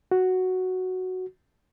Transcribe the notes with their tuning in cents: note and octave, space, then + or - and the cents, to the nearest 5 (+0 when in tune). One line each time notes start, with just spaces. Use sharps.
F#4 +0